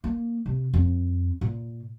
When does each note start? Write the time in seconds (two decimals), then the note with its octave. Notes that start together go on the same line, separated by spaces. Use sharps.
0.04 A#3
0.46 C3
0.74 F2
1.41 A#2